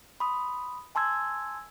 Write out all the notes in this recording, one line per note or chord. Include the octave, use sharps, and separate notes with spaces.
B5 C6 D#6
G#5 A5 C6 E6 G#6